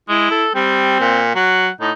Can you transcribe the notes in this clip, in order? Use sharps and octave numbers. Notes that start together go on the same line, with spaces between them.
G#3 E4
A4
G3 C4
A#2
F#3 F#5
A2 D#4